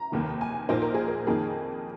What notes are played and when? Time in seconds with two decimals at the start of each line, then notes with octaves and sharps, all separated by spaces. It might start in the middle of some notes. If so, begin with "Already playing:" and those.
Already playing: A#5
0.12 F1 D#2 D#3 A#3
0.41 G#5
0.69 A#1 A#2 A#3 D#4 C5
0.82 A#4
0.94 G#4
1.08 A#4
1.27 F2 D#3 A#3 D#4 G#4